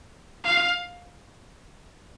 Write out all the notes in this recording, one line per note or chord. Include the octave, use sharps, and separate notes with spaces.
F5